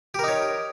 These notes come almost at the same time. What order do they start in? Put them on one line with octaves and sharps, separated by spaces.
G4 A#4 D#4 C#5